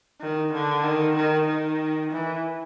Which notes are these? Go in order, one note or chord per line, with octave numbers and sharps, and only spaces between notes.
D#3
D3
D#3
D#3
D#3
E3